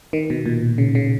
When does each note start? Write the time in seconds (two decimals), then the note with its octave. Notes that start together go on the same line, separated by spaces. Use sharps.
0.13 D#3
0.30 B2
0.46 A#2
0.78 C#3
0.95 C#3